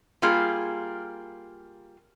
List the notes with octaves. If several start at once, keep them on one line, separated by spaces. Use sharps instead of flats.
G3 A#3 F4 G#4